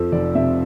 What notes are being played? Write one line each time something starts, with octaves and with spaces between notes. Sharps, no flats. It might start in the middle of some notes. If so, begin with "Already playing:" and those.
Already playing: F2 F3 A4
F1 D5
C3 E5